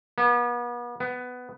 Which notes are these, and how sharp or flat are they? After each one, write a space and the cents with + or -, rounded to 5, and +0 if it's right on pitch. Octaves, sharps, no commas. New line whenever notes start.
B3 -40
B3 +10